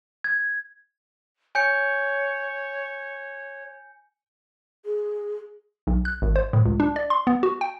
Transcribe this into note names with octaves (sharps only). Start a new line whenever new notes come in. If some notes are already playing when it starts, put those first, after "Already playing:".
G#6
C#5 G#5 G6 C#7
G#4
B1
F#6
G#1
C5
A2
C#2
D4
D5
C6
B3
F#4
G5